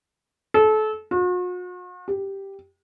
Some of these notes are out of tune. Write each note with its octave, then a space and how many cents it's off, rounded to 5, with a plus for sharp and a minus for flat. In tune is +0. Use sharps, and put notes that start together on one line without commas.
A4 -30
F#4 -45
G4 +0